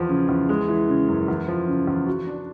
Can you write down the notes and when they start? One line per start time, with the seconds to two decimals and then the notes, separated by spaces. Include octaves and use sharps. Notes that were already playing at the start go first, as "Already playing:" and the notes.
Already playing: E2 F3
0.09 C#3
0.29 E2
0.49 G#3
0.69 E3
0.88 C#3
1.09 F#2
1.28 E2
1.48 F3
1.68 C#3
1.87 E2
2.07 F#4
2.27 D4